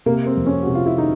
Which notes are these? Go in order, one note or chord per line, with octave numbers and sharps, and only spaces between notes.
C3 A#3
C4
F2
C#4
C3 F#4
F4
E4
D#3 D#4